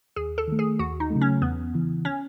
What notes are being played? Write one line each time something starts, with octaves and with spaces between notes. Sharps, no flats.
D#2 G#4
A4
D#3 A3
G#4
D#2 F#4
D#4
C#3 F#3 A3
C#4
E2 B3
C#3 E3
C#4